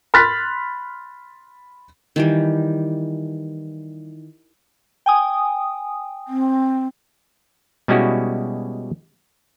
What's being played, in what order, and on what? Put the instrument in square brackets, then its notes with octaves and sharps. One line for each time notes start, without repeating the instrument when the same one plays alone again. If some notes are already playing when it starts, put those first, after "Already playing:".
[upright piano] B5 C6 F6 F#6 A6 B6
[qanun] D#3 E3 G3
[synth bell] G5 G#5 D#6
[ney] C4
[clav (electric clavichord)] B2 G3 G#3 C#4 E4 F#4